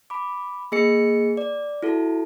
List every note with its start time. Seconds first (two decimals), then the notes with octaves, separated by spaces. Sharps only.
0.10 B5 D6
0.72 A#3 G#4 D#5 C#7
1.37 D5
1.83 E4 F#4 A4